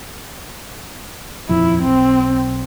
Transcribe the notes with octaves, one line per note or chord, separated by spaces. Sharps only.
D#1 F2 F3 E4
B1 C4